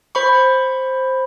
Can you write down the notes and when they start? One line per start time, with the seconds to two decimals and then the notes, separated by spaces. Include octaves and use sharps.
0.15 C5 B5 C#6